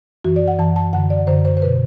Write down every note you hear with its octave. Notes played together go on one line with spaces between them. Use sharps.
F#2 E3 F#4
D5
F#5
F#2 E3 A5
A5
F#2 D3 F#5
D5
F#2 D3 C5
C5
C5
B2 B4